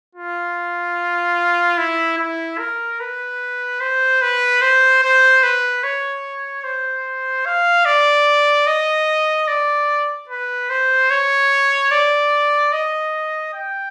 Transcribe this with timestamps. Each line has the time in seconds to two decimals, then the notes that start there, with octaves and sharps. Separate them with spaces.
0.15 F4
1.78 E4
2.18 E4
2.59 A#4
3.00 B4
3.80 C5
4.22 B4
4.62 C5
5.03 C5
5.43 B4
5.84 C#5
6.64 C5
7.46 F5
7.85 D5
8.67 D#5
9.48 D5
10.29 B4
10.70 C5
11.10 C#5
11.91 D5
12.72 D#5
13.54 G5